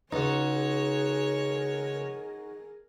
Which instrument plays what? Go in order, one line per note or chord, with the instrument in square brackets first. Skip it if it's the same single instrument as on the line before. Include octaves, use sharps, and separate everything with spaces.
[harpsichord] C#2 [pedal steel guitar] D#4 F#4 [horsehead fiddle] G#4 A#4 [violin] C#5